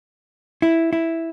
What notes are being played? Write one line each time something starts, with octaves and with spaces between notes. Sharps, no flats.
E4
E4